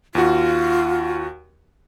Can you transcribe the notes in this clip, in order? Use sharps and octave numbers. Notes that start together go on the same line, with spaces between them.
D#2 F4 F#4